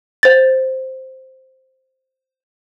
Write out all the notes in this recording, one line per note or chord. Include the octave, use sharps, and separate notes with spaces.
C5 A6